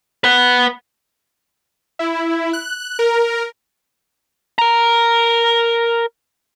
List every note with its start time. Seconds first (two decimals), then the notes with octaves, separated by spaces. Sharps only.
0.24 B4 F#5
1.99 E4
2.53 F#6
2.99 A#4
4.59 A#4 A#5